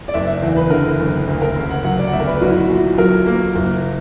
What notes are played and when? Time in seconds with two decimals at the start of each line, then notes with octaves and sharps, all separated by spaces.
0.08 D5
0.14 F#1 E5
0.28 E5
0.42 E2
0.57 B4
0.70 D3 A#4
0.99 F#1
1.27 D2
1.42 A#4
1.56 C#3
1.70 F#5
1.85 F#3 F#5
1.99 D5
2.07 F#5
2.13 D2 E5
2.20 A#4
2.27 B4
2.41 B1 F#4
2.49 E4
2.57 F#4
2.70 A#2
2.98 F#3 A#4
3.26 A#3
3.55 F#1